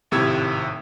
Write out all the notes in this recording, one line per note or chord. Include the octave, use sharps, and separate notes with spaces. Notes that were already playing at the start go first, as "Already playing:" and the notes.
G#1 A2 C3 E6 G#6